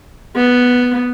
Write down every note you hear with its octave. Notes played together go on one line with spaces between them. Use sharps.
B3